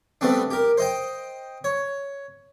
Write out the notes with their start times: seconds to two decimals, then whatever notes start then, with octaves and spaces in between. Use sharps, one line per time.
0.21 G3 A3 B3 C4 D4
0.51 G4 A#4
0.77 C5 D#5 G5
1.64 C#5